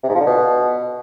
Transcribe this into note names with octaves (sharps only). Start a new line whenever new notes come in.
C3
G#2
F3
D3
B2